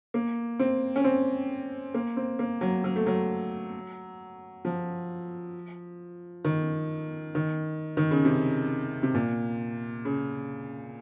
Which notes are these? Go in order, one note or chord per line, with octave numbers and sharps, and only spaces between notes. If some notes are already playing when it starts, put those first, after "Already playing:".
A#3
C4
C#4
C4
A#3
C4
A#3
F#3
F#3
A3
F#3
F3
D#3
D#3
D#3
C#3
C3
C3
A#2
C#3